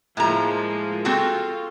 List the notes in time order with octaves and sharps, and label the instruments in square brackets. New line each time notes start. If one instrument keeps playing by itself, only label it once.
[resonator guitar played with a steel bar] A2 A#5 [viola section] F3 G#3 A#3
[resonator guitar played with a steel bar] C4 F#4 A4 [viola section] F4